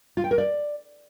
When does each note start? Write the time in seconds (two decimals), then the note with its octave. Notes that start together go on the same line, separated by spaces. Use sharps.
0.17 F4
0.24 G5
0.31 A#4
0.38 D5